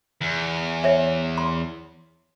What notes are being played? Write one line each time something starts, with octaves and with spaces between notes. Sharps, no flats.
E2
C#5 E5
C6